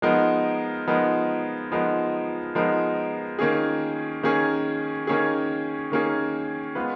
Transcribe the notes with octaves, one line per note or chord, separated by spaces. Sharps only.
F3 G#3 B3 D#4 A#4
F3 G#3 B3 D#4 A#4
F3 G#3 B3 D#4 A#4
F3 G#3 B3 D#4 A#4
D#3 A#3 C#4 G#4
D#3 A#3 C#4 G#4
D#3 A#3 C#4 G#4
D#3 A#3 C#4 G#4
G#3 B3 F4 B4